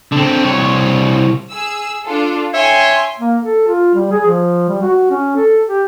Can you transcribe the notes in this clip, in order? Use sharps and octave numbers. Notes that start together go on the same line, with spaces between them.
D3 C4
C2 C#5
G#4 E6
D4 F4 A4
C#5 E5 G5 G#5 C6
A#3
A4
F4
G3
G#4
F3
G3
F#4
C#4
A4
G4